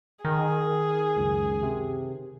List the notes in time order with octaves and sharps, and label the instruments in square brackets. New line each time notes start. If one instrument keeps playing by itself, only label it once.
[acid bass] D#3 [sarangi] G#4 [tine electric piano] A#4
[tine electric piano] C#2 F#2
C3